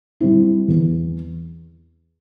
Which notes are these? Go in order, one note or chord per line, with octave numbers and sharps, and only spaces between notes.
G3 C4 E4
E2